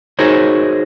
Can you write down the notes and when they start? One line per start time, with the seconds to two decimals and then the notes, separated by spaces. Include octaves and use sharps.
0.19 D#4 F#4 G#4 A#4 C5 C#5